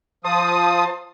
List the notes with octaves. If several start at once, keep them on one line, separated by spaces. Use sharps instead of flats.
F3 C5 A5 D#6